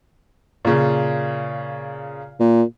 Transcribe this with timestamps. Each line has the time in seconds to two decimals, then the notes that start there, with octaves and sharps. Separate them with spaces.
0.65 A#2 C#3
2.40 A#2